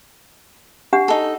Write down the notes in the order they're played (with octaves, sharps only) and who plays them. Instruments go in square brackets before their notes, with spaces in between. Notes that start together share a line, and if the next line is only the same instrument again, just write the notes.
[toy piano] D4 G4 F#5
[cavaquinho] D#4 A4